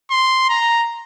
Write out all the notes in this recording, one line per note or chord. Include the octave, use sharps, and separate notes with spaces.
C6
A#5